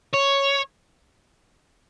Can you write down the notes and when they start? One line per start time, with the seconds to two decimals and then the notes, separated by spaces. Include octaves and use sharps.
0.14 C#5